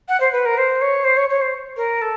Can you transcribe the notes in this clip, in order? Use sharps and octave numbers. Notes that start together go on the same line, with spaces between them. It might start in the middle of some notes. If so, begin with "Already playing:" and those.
F#5
C5
B4
A#4
C5
C#5
C5
C#5
C#5
C5
A#4
A4